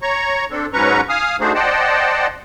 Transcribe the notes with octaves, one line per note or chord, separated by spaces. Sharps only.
C#5 A#5 C#6
C4 D4 A4
G#2 F#3 C#4 B4 A#5 C#6
F5 G#5 D#6 F6
A3 D4 D#4 F#4 G#4 C5
C5 D5 D#5 F#5 G5 A5